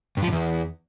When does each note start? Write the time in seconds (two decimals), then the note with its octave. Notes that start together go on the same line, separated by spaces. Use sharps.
0.17 G2
0.22 F3
0.27 G2
0.32 E2